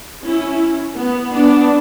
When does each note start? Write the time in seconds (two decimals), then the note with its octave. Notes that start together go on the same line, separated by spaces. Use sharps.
0.25 C#4 E4
0.97 B3
1.32 B3 D4